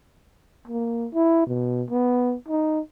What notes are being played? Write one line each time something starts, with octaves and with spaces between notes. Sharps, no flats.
A#3
E4
B2
B3
D#4